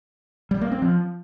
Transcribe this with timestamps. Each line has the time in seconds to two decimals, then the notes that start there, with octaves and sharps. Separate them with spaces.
0.51 G3
0.61 A#3
0.72 C4
0.82 F3